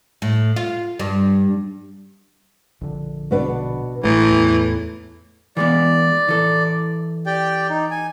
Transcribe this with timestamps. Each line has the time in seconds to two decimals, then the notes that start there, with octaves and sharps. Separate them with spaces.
0.22 A2
0.56 F4
0.99 G2
2.81 A#1 D3
3.31 B2 B3 D4
4.04 A1 A2 E3
4.30 E2
5.57 E3 G#3 B3 D5
6.29 E3 A4
7.26 G4 D5 G5
7.69 D#4
7.91 G#5